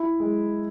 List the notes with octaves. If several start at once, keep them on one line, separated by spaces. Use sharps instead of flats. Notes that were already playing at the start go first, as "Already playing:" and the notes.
Already playing: E4
G#3